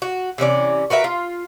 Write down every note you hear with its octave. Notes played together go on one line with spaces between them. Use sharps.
F#4
C3 E3 C#4 D5
F#4 A#4 B4 E5
F4